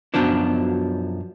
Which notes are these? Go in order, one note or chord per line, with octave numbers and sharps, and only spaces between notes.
F#2 B2 F3 F#3 D4